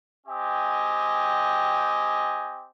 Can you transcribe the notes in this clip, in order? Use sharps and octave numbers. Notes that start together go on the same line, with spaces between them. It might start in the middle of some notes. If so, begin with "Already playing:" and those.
C4 G4 D#5 G#5